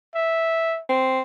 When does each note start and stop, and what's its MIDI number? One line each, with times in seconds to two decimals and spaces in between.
0.15 0.81 76
0.89 1.22 60